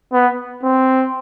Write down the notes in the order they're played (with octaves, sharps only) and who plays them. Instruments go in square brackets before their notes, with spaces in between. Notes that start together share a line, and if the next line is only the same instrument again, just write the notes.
[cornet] B3
C4